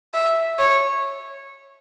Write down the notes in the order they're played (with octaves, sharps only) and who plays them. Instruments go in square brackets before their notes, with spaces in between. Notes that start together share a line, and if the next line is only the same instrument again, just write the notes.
[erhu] E5
C#5